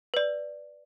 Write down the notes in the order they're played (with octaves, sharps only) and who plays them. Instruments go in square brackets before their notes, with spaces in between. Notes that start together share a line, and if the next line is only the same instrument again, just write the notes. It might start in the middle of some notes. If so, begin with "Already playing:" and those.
[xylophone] B4 D5